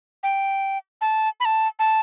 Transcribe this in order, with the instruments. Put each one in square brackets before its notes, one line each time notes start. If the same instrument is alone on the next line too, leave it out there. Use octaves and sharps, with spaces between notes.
[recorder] G5
A5
B5
A5
A5